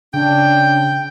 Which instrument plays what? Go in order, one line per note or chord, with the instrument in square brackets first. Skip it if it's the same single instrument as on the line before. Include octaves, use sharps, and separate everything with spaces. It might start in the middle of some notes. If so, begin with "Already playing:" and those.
[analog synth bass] C#3 [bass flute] D4 [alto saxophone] G5